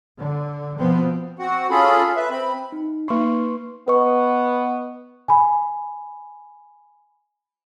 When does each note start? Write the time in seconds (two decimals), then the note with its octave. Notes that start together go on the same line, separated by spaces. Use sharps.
0.18 D3
0.79 B2 F3 B3 C4
1.39 C4 F#4 F#5
1.70 C#4 F4 G#4 A4 B5
2.17 B4 E5
2.30 C4 B5
2.72 D#4
3.08 A#3 D#4 B4 C6 C#6
3.88 B3 B4 D#5 C#6
5.28 G#5 B5